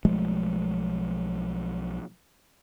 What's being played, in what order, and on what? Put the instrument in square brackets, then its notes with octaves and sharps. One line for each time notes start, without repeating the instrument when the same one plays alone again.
[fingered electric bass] B1 F3 G#3 A3